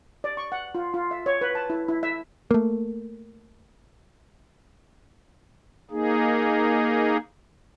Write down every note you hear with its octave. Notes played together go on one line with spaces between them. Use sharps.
D5
C#6
F#5
F4
F4
E5
C#5
B4
A5
E4
E4
E5
A3 A#3
A#3 D#4 G#4